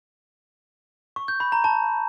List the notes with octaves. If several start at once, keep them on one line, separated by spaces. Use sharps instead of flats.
C#6
G6
B5
A#5
A5